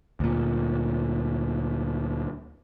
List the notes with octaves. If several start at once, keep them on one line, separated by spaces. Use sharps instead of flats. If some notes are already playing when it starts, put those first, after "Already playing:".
D2 A#2